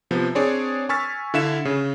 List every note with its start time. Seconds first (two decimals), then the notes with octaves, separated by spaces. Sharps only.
0.11 C3 F3 B3
0.35 C4 D4 G#4 C#5 D5
0.89 G#5 C#6 E6 F6 A6 B6
1.34 D3 E4 E5 F5 E7
1.65 C#3